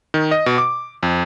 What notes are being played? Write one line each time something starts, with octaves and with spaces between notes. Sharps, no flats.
D#3
D#5
B2
D6
F2